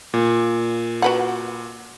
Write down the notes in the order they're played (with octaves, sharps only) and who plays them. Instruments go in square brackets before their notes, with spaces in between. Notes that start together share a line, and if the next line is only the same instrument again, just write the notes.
[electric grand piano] A#2
[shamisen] F#4 B4 F#5